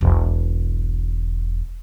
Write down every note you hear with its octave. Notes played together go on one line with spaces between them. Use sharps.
E1 B1